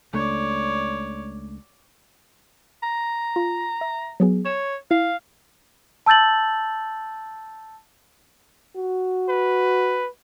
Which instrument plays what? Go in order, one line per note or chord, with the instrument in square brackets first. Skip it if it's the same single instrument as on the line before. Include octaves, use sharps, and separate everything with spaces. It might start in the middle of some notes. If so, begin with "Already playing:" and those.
[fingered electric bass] C#2 A3 D4 [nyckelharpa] C#5 D5
[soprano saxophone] A#5
[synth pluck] F4
E5
F#3 B3 G#4
[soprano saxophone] C#5 [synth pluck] E7
[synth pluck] E4 [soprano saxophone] F5
[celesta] A5 E6 G6 A6 F#7
[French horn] F#4
[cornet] B4